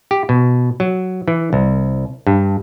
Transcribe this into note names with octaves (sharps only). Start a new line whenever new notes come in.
G4
B2
F#3
E3
C2
G2